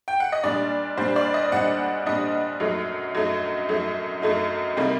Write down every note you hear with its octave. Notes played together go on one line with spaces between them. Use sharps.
G5
F#5
D#5
A#2 G3 D4 D5
A#2 G3 D4 C5
D5
D#5
A#2 G3 D4 F#5
A#2 G3 D4 D#5
F#2 F#3 A3 D#4
F#2 F#3 A3 D#4
F#2 F#3 A3 D#4
F#2 F#3 A3 D#4
C3 G3 A#3 D#4